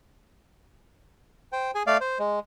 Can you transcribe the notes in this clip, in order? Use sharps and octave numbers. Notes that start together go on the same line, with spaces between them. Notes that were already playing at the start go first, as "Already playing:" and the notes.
C5 G5
G#4 G#5
A3 D5 F5
C5
G#3